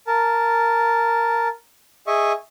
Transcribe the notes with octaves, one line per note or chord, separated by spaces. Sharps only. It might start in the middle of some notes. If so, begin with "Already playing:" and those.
A#4 A5
G#4 D#5 E5 C#6